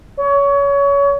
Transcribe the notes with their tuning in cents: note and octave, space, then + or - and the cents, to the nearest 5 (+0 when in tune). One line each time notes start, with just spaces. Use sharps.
C#5 +25